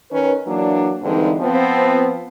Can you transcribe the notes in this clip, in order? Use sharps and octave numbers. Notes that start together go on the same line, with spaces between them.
D#3 C#4 A#4 B4
E3 F#3 A#3 D4
G2 D3 E3 G#3 C4 D#4
F3 B3 C4